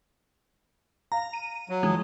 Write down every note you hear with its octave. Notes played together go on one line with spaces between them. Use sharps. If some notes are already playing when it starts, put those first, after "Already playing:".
F5 A#5
D#7
F#3
E3 F3 G#3